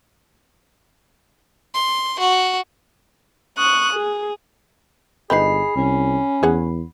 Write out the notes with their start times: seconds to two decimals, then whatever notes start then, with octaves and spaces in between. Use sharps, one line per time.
1.74 C6
2.19 F#4
3.58 C#6 D#6 F#6
3.93 G#4
5.30 G1 D#4 G#4 B4 G5 B5 C7
5.76 C2 C#4
6.43 E2 G#4 C#5 F#5